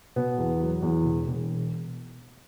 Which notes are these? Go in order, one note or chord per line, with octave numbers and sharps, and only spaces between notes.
B2 B3
E2
F#3
E2
E1
E1